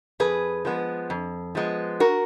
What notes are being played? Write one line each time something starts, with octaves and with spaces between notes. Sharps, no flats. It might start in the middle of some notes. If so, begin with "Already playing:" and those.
F2 G#4 B4
F3 G#3 B3
F2
F3 G#3 B3
F#4 A#4